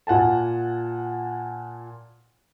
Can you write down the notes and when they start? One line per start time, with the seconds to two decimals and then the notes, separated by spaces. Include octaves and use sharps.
0.07 A#2 F#5 G#5 A5